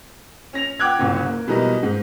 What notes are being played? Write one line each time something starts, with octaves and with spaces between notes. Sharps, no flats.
C#4 A#6 F7
F#5 G5 D6 F#6 G#6
F#1 C2 F#2
A#3
B2 E3 F#3 G3 D#4 A#4
G#2